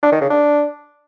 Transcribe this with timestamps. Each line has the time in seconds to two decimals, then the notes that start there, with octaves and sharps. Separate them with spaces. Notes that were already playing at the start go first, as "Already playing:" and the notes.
0.03 D4
0.12 D#3
0.21 C#3
0.30 D4